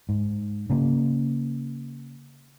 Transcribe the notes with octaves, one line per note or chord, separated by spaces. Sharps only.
G#2
C#3 A#3